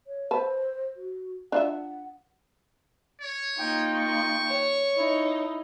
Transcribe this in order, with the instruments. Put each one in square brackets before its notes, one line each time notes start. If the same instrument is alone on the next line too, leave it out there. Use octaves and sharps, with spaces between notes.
[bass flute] C#5
[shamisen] B4 A5 [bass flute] C5
[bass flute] F#4
[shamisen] D4 F4 E5 [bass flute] F#5
[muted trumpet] C#5
[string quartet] A#3 D#4 F4 [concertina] G5
[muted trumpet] C#6
[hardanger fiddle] C#5
[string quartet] D#4 [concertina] E4